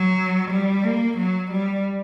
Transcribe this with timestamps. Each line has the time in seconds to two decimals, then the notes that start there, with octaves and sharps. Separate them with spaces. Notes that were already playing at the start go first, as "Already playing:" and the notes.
Already playing: F#3
0.51 G3
0.84 A#3
1.17 F#3
1.51 G3